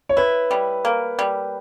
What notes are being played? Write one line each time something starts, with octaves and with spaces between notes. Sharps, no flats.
C#5
E4 B4
G3
A#3
G3